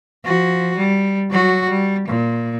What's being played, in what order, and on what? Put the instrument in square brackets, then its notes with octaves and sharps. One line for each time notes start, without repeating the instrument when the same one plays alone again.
[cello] F3 F#4
G3
F#3 F#4
G3
A#2